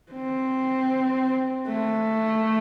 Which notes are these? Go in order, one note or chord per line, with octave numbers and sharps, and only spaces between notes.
C4
A3